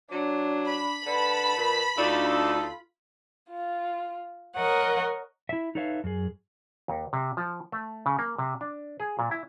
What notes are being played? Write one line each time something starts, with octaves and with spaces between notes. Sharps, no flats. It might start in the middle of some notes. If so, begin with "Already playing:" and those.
F#3 D4
B5
D3 B4 A5
A#2
D2 D4 D#4 F4 A4
F4
A#4 C#5 D#5 F#5
E4 E5
D#4 A4 B4 C#5 E5 F5
F#2 G#4
D#2
C3
F3
A3
C#3
A#3
C3
D4
G#4
A#2
E4